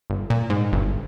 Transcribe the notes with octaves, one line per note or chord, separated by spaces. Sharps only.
G1
A#2
G#2
G1